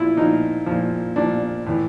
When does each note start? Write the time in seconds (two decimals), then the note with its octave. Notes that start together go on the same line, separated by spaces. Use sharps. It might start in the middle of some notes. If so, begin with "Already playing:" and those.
Already playing: A#2 F3 E4 F4
0.17 A#2 F3 D#4
0.66 A#2 F3
1.16 A#2 F3 D4
1.66 A2 E3